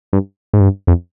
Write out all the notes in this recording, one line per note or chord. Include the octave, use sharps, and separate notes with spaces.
G2
G#2
G2
F2